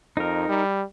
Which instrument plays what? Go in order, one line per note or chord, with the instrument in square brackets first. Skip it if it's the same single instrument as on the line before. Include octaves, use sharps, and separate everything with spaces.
[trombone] F2 [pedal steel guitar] D#4 A#4
[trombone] G3